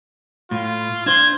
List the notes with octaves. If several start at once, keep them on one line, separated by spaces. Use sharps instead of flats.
A2 F4
D4 C5 G#6